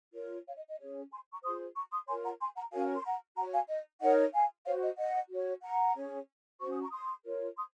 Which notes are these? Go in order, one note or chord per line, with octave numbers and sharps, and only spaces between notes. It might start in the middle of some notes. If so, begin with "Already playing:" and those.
F4 A#4 C#5
C#5 F5
D#5
D#5
C#4 G#4 C#5
G#5 C6
A#5 C#6
F4 G#4 C5 C6 D#6
A#5 C#6
C6 D#6
F4 A#4 C#5 G#5 C6
F#5 A#5
G#5 C6
F#5 A#5
C#4 F#4 A#4 C#5 F5 G#5
C6
F#5 A#5
F#4 C#5 F#5 A#5
F5 G#5
D#5
D#4 A#4 C#5 D#5 F#5
F5 G#5
F#4 C5 C#5 F5
D#5
D#5 F#5
F#4 C#5
F#5 A#5
C#4 G#4 C#5
C#4 F#4 C5 C#6
D#6
A#5 C#6
C6 D#6
F4 A#4 C#5
C6 D#6